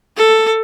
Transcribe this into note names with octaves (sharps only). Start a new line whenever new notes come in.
A4